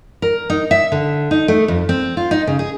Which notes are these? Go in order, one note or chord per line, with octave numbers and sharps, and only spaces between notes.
A#4
D#4
E5
D3
D#4
A3
F2
C4
F4
D#4
C#3
G#4